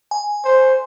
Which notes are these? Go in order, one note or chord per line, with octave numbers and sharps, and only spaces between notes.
G#5
C5